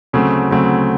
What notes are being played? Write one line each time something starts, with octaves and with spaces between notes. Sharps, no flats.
D2 C#3 F#3 A3 C4
D2 C#3 F#3 A3 C4